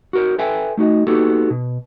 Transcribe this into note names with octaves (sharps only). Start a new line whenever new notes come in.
F#4 A#4 C5
A4 B4 E5 G5 G#5
A3 D#4 F#4 D#5
A#3 B3 D#4 F#4 G4 A4
B2